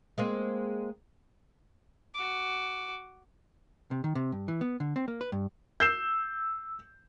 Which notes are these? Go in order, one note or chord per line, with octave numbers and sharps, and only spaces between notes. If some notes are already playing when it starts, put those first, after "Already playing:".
G#3 A#3 C4
F#4 D6
C3
D#3
C3
G2
E3
B3
D3
C4
A#3
B4
G2
E6 G6 C7 E7